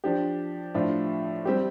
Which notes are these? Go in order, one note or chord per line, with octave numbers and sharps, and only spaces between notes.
F3 D4 G4
A2 F3 D4 F4
G3 C4 G4